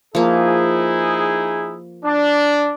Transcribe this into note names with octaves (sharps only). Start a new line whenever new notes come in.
F3 A#3 D#4 E4 G#4
D4